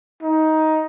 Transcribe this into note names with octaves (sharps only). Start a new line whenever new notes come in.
D#4